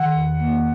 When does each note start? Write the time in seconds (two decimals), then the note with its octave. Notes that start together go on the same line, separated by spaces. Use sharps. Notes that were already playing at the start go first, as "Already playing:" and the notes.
Already playing: D#3 F#5
0.15 E2
0.40 A#3